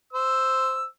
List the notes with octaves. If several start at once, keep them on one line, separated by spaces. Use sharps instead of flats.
C5 E6